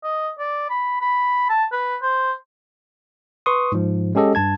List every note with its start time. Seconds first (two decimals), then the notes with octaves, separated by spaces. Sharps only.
0.04 D#5
0.39 D5
0.70 B5
1.01 B5
1.50 A5
1.72 B4
2.02 C5
3.46 B4 C6 C#6 D#6
3.72 G#2 F3
4.15 G#3 C#4 G4 A4 D#5
4.35 G2 A5 G#6